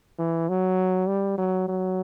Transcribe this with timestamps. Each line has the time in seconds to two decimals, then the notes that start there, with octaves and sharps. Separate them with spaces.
0.19 E3
0.49 F#3
1.08 G3
1.38 F#3
1.69 F#3